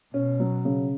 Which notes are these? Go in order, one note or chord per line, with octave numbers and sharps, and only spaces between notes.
B2 C#4
F#3
C#3